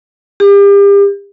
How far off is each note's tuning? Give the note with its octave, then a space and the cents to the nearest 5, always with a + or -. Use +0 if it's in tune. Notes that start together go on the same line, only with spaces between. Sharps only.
G4 +40